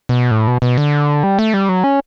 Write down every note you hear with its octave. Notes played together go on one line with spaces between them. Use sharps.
B2
A2
B2
B2
D3
G3
A3
G3
F#3
C#4